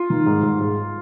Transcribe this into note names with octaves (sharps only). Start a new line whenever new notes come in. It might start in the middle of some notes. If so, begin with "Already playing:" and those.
Already playing: F4
D#3
G#2
G#2
G#2